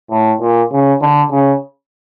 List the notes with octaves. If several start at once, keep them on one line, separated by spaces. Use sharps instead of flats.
A2
A#2
C#3
D3
C#3